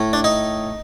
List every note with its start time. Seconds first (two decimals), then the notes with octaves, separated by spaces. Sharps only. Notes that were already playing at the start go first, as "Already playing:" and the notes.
Already playing: A2 A3
0.13 D4
0.24 D#4